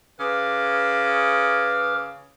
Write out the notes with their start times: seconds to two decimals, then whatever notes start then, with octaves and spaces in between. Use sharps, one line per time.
0.20 C#3 B4 D6 F6